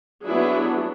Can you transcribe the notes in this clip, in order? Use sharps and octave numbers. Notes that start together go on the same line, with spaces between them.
F#3 B3 D4 E4 G#4